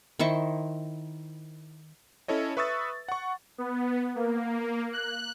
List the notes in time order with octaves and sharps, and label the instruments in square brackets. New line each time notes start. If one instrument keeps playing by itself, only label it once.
[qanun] D#3 E4 C5 C#6
[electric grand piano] C#4 E4 A4 C#5 D#5
B4 E5 C#6 D#6 E6 A6
F#5 C#6
[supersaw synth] B3
A#3
F#6